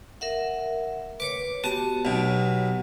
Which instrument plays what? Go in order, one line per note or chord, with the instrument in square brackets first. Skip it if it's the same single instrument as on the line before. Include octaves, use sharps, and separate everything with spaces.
[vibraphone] A#4 E5 F#5
[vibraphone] B4 C#5 [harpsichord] D6
[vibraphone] B3 F#4 G4 [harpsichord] A5
[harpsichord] B1 B2